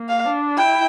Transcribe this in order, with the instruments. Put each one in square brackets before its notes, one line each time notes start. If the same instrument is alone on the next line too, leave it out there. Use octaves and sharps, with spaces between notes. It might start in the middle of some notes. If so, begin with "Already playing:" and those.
Already playing: [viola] A#3
[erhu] F5
[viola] D4
[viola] E4 [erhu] G5